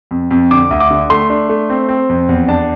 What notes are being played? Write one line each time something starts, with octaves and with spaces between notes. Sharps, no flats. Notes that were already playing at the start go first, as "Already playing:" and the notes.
F2
F2
D3 D6
D2
D6
D3
A3 C6
D4
A3
C4
C4
F2
E2
D4 A5